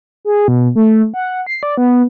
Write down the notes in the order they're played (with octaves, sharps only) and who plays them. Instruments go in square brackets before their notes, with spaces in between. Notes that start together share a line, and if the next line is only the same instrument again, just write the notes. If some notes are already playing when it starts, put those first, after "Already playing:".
[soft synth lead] G#4
B2
A3
F#5
C7
D5
B3